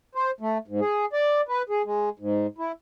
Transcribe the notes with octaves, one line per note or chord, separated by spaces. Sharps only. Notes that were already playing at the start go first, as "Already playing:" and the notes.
C5
A3
G#2
G#4
D5
B4
G#4
G#3
G#2
E4